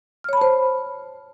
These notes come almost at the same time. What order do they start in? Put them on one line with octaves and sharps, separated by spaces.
F6 C#5 B5 A5 C5